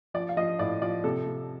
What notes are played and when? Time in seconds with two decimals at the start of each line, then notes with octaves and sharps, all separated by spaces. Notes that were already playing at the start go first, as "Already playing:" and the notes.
0.14 F3 D5
0.29 F5
0.37 F3 D#5
0.59 A2 D5
0.82 F3 D5
1.04 C3 A4
1.26 C3